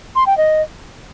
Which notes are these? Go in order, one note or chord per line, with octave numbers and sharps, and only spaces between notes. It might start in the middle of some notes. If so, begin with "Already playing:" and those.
C6
G5
D#5